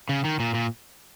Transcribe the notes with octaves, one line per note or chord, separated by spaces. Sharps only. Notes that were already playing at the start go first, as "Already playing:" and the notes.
C#3
D#3
A#2
A#2